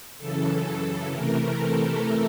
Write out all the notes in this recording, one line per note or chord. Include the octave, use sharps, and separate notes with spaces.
F#2 C#3 E3 A4
A4
C3 E3 A3 A#4
A4